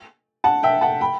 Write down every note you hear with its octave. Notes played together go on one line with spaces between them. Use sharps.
F#5 A5
E5 G5
F#5 A5
G5 B5